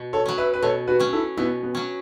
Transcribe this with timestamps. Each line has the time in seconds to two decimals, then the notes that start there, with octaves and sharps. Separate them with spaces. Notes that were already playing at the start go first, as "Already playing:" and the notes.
Already playing: B2
0.13 A4 C#5
0.26 F#3 C#4
0.38 B4 E5
0.54 B4
0.62 B2 A4 C#5
0.88 F#4 B4
0.99 F#3 C#4
1.13 E4 A4
1.37 B2 B3 E4
1.63 B3
1.75 F#3 C#4